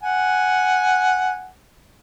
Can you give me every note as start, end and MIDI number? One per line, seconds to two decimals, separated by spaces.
0.03 1.47 78
0.03 1.47 80